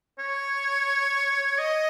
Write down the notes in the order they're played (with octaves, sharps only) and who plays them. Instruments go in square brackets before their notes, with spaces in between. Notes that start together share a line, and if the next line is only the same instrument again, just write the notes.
[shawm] C#5
D#5